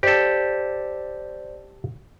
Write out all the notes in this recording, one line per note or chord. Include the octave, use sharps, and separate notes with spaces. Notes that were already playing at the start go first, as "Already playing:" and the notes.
G4 A4 C5 D5 D#5